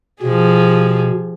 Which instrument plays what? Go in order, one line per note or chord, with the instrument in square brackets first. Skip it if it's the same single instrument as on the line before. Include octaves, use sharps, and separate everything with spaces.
[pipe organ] B2 [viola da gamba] F3 G4 G#4